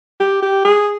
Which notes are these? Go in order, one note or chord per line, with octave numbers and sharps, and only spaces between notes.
G4
G4
G#4